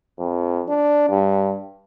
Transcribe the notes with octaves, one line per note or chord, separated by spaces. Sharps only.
F2
D4
G2